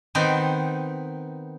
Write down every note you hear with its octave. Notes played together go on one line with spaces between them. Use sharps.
D#3 B3 C4 D#4